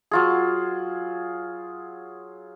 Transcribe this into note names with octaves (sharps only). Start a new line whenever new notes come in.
F#3 F4 G#4